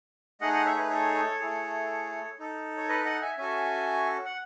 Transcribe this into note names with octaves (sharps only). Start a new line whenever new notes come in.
A3 D#4 G#4 D#5 F#5
D#5 F#5
C#5 E5
B4
A4 C#5
A3 E4 G#4
D#4 A4
C#5
B4 D#5
D#5 F#5
E5 G#5
C#4 F#4 A4 E5 G#5
F#5